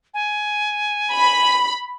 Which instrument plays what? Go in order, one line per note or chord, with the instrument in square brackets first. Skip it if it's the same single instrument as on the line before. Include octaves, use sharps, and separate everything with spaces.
[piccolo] G#5
[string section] B5